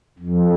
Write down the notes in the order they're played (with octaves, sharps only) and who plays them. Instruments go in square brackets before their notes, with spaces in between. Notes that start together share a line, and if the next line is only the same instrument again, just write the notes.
[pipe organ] F2